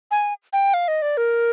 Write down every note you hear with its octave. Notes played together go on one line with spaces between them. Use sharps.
G#5
G5
F5
D#5
D5
A#4